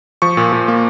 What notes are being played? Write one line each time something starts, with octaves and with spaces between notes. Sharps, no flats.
F3 C#6
A#2
A#2
A#3